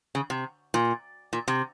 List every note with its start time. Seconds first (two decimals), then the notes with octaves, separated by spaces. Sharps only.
0.15 C#3
0.30 C3
0.74 A#2
1.33 A#2
1.48 C3